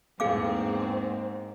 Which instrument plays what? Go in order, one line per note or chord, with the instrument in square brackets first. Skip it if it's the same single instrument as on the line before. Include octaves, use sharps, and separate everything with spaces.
[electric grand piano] E2 A#3 [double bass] G#2 [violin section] C4 [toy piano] G#4 F5 D6